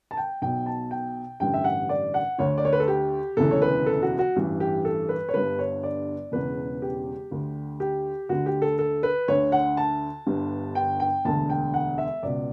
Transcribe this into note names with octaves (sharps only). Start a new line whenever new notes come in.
A5
G5
B1 B2 G5
A5
G5
A1 G2 D3 G5
E5
F#5
D5
F#5
D2 D3 C#5
D5
C#5
B4
A4
G4
E1 D2 C#3 E3 A4
C#5
B4
A4
F#4
F#4
A1 G2 E3
G4
A4
B4
C#5
G1 G2 D3 B4
C#5
D5
E1 E2 C#3 B4
G4
D2 D3
G4
D2 D3 F#4
G4
A4
A4
B4
D2 D3 C#5
F#5
A5
G1 G2 D3
G5
G5
E1 D2 D3 A5
G5
F#5
E5
C#2 B2 D5